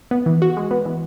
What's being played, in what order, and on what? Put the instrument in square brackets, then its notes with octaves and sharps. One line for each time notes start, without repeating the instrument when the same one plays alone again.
[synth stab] B3
E3
F#4
G#3
B3
E3